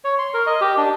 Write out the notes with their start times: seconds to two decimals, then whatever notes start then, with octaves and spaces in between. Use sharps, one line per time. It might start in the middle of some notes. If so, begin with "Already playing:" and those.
0.04 C#5
0.18 C6
0.34 A#4
0.47 D#5
0.61 G4
0.77 D4